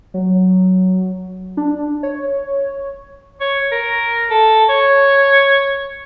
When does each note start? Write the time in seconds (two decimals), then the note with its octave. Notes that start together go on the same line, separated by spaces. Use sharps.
0.14 F#3
1.57 D4
2.03 C#5
3.41 C#5
3.72 A#4
4.31 A4
4.69 C#5